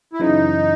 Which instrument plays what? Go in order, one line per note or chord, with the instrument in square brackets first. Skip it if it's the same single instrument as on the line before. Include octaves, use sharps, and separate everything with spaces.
[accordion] E4
[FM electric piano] F#2 C#3 E3 [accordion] D#4